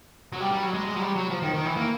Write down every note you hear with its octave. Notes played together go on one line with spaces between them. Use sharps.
F#3
G3
G3
F#3
G#3
G#3
F#3
G3
F#3
F3
D#3
D#3
E3
A#3